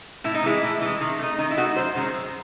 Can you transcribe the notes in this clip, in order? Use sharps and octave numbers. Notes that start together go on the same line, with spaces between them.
A2 E4
D#4
E3 G#3 E4
A2
E3 G#3
D#3
A3 D#4
D#3 D#4
E4
A3 D#4 F#4
F#2 C5
D#3 G#3 C#4
F#2